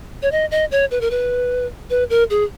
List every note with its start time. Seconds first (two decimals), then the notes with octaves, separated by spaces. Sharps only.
0.22 C#5
0.32 D#5
0.51 D#5
0.71 C#5
0.91 B4
1.01 A#4
1.11 B4
1.90 B4
2.10 A#4
2.30 G#4